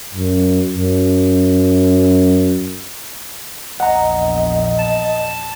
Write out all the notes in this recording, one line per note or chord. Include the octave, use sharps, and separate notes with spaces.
F#2
F#2
A#1 E2 D#5 F#5 A#5
A5